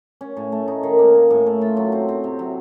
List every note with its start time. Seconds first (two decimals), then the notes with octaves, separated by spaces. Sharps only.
0.21 C#4
0.37 A2
0.52 A3
0.68 D#4
0.83 D#3
0.99 A#3
1.14 C#4
1.30 A2
1.46 A3
1.61 F4
1.77 F#3
1.92 C4
2.09 C4
2.24 C3
2.39 F#3